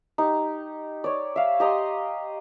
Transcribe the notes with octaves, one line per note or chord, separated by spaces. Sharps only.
D#4 G4
C#5 D5
E5 F5
G4 D#5 A#5 C6